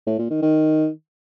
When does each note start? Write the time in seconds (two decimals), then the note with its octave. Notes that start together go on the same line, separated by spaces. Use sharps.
0.07 A2
0.19 A#2
0.30 D#3
0.42 D#3